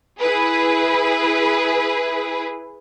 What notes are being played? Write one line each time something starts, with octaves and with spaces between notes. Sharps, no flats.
E4 G#4 B4